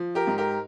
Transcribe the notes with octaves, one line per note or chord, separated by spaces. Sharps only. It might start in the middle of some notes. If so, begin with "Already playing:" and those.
Already playing: F3
G4 A#4
G#2
G4 A#4